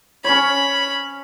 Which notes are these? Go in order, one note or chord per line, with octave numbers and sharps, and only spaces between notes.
C#4 C#5 B5